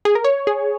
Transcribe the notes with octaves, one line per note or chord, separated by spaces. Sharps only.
G#4
A#4
C#5
G#4